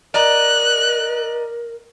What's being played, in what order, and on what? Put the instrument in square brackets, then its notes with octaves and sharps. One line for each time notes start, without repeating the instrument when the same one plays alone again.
[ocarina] A#4 [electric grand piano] D5 D#5 A#5 [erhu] F#6